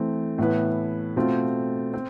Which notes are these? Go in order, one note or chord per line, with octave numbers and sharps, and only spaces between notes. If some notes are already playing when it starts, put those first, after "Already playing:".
Already playing: E3 A3 C4
A2 E3 B3 E4 B4
B2 A3 C4 F4
C4